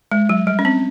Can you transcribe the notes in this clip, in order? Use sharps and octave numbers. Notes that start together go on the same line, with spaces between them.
G#3
F#3
G3
C#4
C4